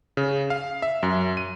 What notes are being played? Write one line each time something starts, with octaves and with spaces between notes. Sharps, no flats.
C#3
F5
E5
F#2
D#7